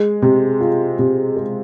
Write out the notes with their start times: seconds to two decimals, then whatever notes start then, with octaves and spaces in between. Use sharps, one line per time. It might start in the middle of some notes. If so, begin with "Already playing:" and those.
Already playing: G#3
0.22 C3
0.60 F4
0.99 C3
1.36 G#3